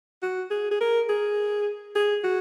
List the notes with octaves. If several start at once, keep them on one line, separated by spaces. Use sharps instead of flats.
F#4
G#4
G#4
A#4
G#4
G#4
F#4